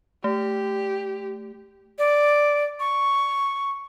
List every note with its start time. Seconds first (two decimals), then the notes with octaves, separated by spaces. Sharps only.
0.24 A3 G4
1.99 D5
2.80 C#6